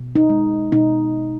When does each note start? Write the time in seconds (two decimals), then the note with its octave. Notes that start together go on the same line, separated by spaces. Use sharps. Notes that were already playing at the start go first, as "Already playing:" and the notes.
Already playing: B2
0.15 D#4
0.30 G#3
0.72 B2 D#4